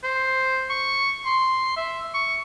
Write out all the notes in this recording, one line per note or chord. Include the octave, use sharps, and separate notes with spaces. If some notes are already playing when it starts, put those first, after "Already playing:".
C5
C#6
C6
E5
C#6